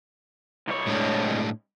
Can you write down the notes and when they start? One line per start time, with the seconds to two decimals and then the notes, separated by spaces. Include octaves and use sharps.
0.68 C2 C#5
0.87 A2 G#3 D4